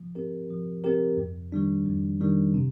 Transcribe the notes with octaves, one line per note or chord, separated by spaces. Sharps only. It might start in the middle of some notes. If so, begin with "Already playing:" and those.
Already playing: F3
C4 G4 A#4
F3
C4 G4 A#4
F2
D#3 G3 D4
F2
D#3 G3 D4
C3